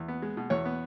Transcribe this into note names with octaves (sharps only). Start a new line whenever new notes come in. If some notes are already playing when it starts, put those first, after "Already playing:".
Already playing: E2
B3
G#3
B2
E2 C#5
B3